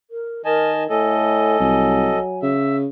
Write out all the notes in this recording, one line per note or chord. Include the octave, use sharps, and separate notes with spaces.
A#4
D#3 A#4 D#5 G#5 A5
A2 A4 D#5 G#5
C2 F#3
C#3 E5